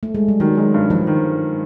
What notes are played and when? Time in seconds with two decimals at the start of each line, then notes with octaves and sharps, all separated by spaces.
0.03 A3
0.15 G#3
0.28 G3
0.40 D#3 F#3
0.58 G#3
0.74 G2
0.90 G2 F3
1.07 D#3